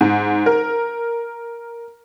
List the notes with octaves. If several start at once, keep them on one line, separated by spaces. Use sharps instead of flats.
G#2
A#4